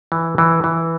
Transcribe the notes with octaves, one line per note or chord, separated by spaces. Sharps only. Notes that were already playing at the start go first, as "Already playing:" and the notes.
E3
E3
E3